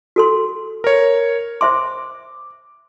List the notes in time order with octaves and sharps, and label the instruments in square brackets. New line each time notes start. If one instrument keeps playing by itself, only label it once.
[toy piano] F#4 A4 C6
[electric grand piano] A#4 C#5
[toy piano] C5 E5 C6 [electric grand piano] D6